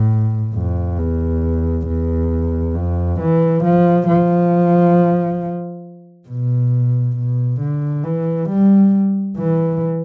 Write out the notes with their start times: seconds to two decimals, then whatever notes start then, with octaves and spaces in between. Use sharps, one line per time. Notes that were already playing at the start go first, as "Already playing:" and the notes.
Already playing: A2
0.55 F2
0.99 E2
1.87 E2
2.75 F2
3.20 E3
3.64 F3
4.08 F3
6.28 B2
7.16 B2
7.60 D3
8.04 E3
8.49 G3
9.37 E3